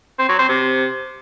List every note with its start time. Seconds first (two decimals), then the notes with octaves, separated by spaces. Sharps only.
0.19 C4
0.29 F#3
0.39 C4
0.49 C3